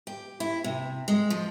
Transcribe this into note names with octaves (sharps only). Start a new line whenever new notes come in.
G4
E4
C3
G#3
F3